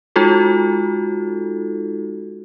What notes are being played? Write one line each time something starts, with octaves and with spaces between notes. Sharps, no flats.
G#3 D#4 F4 F#4 A4